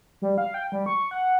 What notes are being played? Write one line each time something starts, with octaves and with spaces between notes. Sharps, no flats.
G3
F5
G5
G3
C#6
F#5